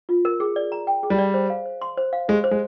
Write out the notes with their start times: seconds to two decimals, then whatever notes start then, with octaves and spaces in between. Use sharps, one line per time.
0.09 F4
0.25 A#4
0.40 G#4
0.56 D5
0.72 A#5
0.87 G5
1.03 G#4
1.10 G3
1.19 D5
1.34 C5
1.50 F5
1.65 C5
1.82 C6
1.97 C5
2.13 F5
2.28 G#3 G4
2.44 C5
2.51 G#3